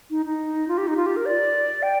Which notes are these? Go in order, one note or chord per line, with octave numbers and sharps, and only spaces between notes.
D#4
D#4
F4
G4
D#4
F4
G4
A#4
D5
G5